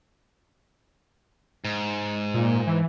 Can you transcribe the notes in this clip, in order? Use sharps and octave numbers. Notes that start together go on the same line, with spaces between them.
G#2
A#2
E3